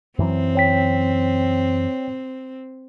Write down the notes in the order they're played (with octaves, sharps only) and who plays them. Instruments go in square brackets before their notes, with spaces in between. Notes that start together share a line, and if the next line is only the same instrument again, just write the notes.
[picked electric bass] F#2 E3 F#3 [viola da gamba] C4
[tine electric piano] C#5 G5 B6